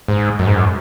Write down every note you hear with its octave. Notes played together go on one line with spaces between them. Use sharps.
G#2
F#2
G#2
F#2